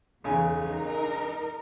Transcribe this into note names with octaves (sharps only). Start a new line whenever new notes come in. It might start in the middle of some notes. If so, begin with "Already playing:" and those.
B1 E2 C#3 G#5
D#4 A#4